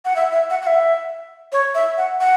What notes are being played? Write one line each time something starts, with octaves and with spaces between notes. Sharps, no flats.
F#5
E5
E5
F#5
F#5
E5
C#5
E5
F#5
F#5